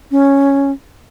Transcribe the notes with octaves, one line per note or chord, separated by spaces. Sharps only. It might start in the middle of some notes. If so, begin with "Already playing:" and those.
C#4